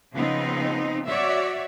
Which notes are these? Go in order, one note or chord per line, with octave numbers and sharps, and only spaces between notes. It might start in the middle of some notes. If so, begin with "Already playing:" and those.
C#3 F3 B3 C4 D#4
F#4 C#5 D5 E5